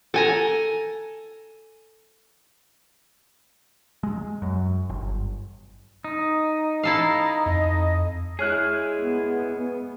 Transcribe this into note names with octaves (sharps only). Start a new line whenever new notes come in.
A4 G#5 A#5
G#3
F#2
G1
D#4
E4 A4 F5 A#5
F2 D#5
G#3 E4 G#4 C#5 F6 F#6
B3